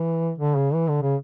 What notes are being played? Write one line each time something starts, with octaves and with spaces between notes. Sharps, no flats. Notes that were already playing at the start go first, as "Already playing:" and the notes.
Already playing: E3
D3
C#3
E3
D3
C#3